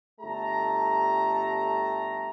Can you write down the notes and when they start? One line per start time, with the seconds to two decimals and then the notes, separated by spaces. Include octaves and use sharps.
0.20 G1 A3 G4 A5 A#5